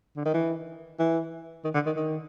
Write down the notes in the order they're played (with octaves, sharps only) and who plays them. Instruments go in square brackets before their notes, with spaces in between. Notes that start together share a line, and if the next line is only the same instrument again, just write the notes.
[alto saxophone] D3
D#3
E3
E3
D#3
D3
D#3
D#3